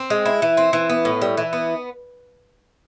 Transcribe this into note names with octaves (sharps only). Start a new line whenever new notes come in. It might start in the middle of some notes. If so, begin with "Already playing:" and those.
Already playing: C4
G#3
E4
E3
C4
E3
B3
A2
G3
E3
B3